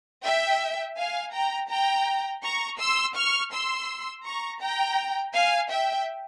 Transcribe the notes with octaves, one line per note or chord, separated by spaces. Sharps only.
E5 G5
F5 G#5
G5 A#5
G5 A#5
A#5 C#6
C6 E6
C#6 F6
C6 E6
A#5 C#6
G5 A#5
F5 G#5
E5 G5